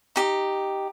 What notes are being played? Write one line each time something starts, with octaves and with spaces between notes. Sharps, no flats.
D#4 G4